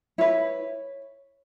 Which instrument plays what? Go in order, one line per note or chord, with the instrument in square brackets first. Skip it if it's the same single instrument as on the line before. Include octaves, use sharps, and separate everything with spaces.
[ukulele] E4 B4 C#5